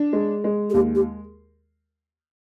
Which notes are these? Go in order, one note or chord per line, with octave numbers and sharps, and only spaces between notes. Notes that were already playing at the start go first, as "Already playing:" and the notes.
Already playing: D4
G#3
G#3
G#4
D#2 G4
G4